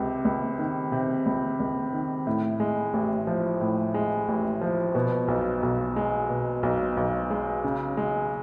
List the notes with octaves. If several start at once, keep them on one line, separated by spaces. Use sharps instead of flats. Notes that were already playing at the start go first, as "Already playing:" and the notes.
Already playing: C#2 C3
C#2
D#3
C3
C#2
C#2
D#3
A2
G#3
A1
F3
A2
G#3
A1
F3
B2
B1
B1
G#3
B2
B1
B1
G#3
C#3
G#3